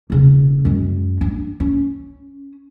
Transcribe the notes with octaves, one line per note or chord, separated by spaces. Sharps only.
E1 C#3
F#2 G#3
D4
C#4